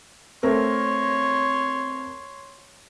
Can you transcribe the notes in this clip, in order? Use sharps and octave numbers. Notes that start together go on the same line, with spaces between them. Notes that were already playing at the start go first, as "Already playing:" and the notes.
A3 C4 A#4 C#5 C6